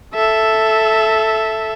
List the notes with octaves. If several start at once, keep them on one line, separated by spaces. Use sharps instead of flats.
A4 E5